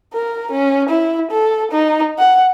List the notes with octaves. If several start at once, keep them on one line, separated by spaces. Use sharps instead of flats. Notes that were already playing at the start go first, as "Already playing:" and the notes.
A#4
C#4
E4
A4
D#4
F#5